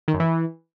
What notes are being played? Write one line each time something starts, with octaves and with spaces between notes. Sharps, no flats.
D#3
F#2
E3